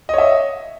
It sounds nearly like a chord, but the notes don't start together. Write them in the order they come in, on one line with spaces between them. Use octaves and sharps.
D#5 C#5 E5